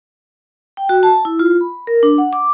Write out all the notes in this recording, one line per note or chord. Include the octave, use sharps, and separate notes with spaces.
G5
F#4
A5
E4
F4
B5
A#4
D4
F#5
D6